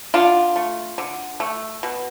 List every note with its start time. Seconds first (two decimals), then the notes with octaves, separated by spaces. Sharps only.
0.14 D3 D4 F4
0.56 A3
0.98 D3
1.40 A3
1.83 B2